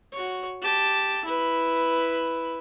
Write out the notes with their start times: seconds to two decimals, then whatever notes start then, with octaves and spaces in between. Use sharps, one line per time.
0.13 F#4 C#5
0.62 G4 A5
1.25 E4 B4